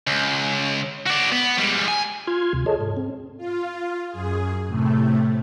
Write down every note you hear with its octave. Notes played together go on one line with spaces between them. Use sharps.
C#2
F#4 D5
B3
G3 G#3
C#2 G#5
F4 C6 F6 G#6
D2 C3
G#4 A4 C#5 D#5 A5
G#2
C4
F4
F#2 G#4
A2 C3 A3